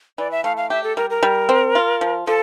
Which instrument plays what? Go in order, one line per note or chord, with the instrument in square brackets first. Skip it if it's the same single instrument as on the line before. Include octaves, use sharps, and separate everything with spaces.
[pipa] E3 [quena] D5
[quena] E5
[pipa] A3 [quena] F5
[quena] F5
[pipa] G4 [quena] E5
[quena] A4
[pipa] G3 [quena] A#4
[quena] A#4
[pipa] G3
C4
F4
F3
[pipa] F3 [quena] A4